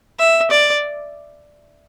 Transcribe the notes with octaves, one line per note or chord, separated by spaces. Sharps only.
E5
D5